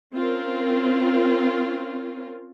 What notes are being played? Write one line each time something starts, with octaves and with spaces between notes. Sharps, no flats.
C4 C#4 F4 A#4